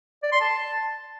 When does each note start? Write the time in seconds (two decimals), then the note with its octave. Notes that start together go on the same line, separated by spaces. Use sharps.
0.23 D5
0.32 C6
0.41 A5